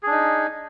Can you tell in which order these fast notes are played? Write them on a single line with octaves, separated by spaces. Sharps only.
G#4 D4 D#4